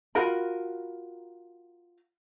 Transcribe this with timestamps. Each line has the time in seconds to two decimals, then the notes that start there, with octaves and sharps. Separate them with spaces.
0.15 F4 F#4 A#4 B5